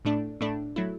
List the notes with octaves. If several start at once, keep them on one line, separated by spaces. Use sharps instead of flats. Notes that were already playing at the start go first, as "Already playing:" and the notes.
A2 A3 D4
A2 A3 D4
F#3 A3 E4